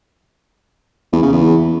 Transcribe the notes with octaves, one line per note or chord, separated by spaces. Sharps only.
E2
C#3
E2